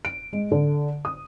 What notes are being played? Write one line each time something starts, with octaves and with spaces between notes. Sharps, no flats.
D7
G#3
D3
D#6